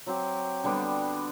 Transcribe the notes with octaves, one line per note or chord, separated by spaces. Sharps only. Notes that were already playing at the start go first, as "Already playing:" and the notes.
F#3 C4 G4
D3 G3 B3 D4